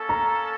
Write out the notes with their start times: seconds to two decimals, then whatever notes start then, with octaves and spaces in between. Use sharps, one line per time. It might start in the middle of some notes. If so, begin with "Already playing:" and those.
Already playing: A#3 C#4 A4
0.09 A#5